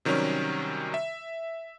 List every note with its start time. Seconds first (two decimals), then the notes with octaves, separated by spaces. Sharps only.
0.05 C3 D#3 F#3 G3 C#4
0.94 E5